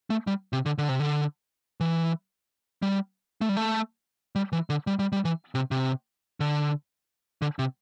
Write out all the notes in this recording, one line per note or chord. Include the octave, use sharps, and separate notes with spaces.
A3
G3
C3
D3
D3
C3
D3
E3
G3
A3
G3
A3
G3
E3
D3
G3
G3
G3
E3
C3
C3
D3
D3
C3